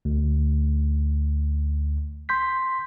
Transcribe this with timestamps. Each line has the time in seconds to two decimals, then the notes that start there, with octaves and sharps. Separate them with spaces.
0.05 D2
2.29 C6 G6 B6